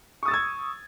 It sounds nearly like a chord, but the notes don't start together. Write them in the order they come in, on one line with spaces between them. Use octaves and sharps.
C#6 D#6 A6 E6 G#6